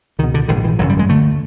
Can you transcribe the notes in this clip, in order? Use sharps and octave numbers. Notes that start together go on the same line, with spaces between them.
C#2 B2 D#3
D3
A#1 G#2 D#3
E3
G#1 F#2 C#3 F#3
G3
G#3
D2 D3 A3